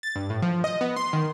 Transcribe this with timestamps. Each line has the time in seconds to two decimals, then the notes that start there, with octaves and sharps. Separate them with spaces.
0.03 A6
0.16 G2
0.30 A2
0.42 F3
0.64 D#5
0.81 B3
0.96 C6
1.13 D#3